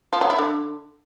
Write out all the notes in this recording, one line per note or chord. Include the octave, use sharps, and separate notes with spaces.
F3
F#3
E4
D3